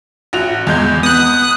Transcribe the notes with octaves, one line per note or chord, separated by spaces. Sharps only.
A1 F#4 F7
E2 G#3 G6
B3 D#6 F#6